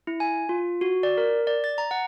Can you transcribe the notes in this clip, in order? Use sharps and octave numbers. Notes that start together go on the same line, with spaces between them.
E4
G#5
F4
F#4
D5
A#4
D5
A6
A#5
F#5